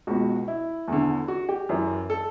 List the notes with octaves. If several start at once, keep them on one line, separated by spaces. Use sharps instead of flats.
C#2 B2 F#4
E4
E2 D3
F#4
G4
F#2 E3
A4